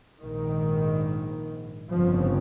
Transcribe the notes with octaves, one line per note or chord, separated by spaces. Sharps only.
A#1 G#2 D#3
G1 F2 C#3 F3